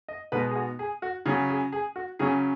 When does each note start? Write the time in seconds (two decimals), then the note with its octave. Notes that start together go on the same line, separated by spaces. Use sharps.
0.08 D#5
0.32 B2 G#3 B3 D#4 B4
0.51 G#4
0.56 F#4
0.79 G#4
1.02 F#4
1.26 C#3 F#3 C#4 G#4
1.49 G#4
1.72 G#4
1.96 F#4
2.19 C#3 F#3 C#4 G#4